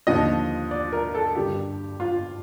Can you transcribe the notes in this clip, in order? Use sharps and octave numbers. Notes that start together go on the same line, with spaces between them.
D#2 D3 F3 D#5
D5
A#4
A4
G2 D3 G3 G4
F4